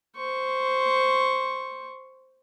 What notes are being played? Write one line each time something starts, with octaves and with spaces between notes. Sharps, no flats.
C5 C#6